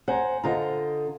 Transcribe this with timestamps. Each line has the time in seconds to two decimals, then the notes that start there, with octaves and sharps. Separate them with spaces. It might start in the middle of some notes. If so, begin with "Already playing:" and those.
0.08 C5 F#5 G#5 A#5
0.44 D3 F4 C5 D#5 A#5